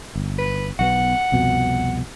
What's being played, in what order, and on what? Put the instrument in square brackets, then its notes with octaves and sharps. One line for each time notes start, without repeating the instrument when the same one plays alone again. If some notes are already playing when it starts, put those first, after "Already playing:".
[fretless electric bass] G1
[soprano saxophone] B4
[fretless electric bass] B1 F#3 B3 [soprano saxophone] F#5
[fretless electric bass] C2 F2 B2